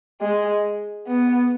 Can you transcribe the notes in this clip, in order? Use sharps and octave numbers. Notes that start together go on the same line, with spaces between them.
G#3
B3